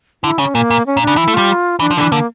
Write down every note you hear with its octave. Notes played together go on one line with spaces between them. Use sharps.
D3 E4
C#3 C#4
A#2 A#3
A#2
C#4
A#2
D4
C#3
E3 E4
A3
G3 F4
E3 D4
F3
D3 E3 D4
D3 A#3